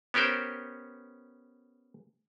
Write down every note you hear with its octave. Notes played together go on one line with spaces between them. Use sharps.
B3 C#4 G4 A#4 C5